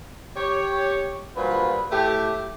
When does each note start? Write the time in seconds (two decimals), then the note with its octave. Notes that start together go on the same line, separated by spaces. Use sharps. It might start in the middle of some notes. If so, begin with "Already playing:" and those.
0.37 G4 C#5
1.36 G2 A#2 F3 F#4 B4
1.92 A2 A3 G4